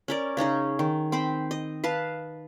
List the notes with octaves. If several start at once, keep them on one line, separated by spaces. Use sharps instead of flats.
C#4 A#4 D5
C#3 C#4 D#4 G#4
D#3
C4 C5 B5
D#5
B4 F5 A5